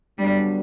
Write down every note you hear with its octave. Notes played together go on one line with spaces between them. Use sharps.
D3 F#3 G3 B3 D4